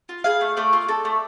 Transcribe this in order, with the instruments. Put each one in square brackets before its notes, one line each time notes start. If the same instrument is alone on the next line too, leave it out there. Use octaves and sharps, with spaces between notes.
[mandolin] F4
G#4 F5
A3
A3 D5
F4
A4
A3